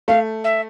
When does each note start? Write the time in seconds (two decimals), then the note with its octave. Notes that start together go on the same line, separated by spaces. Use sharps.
0.08 A3 F5
0.44 E5